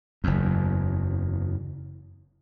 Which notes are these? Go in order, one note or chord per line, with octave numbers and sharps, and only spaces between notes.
F#1 E2